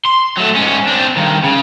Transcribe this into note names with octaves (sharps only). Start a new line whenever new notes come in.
C6
F#3 A3
G#2 C#4
C4 D4
G2 D#3
C#3